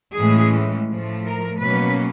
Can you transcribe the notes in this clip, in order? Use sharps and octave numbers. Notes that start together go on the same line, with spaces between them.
A2 E3 G#3 C#4 G#4
A2 F3 A3
A#4
B2 F#3 A#3 C#4 B4